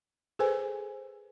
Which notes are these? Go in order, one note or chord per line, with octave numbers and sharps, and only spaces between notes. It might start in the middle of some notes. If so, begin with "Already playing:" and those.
G#4 A4 B4 C5 G#5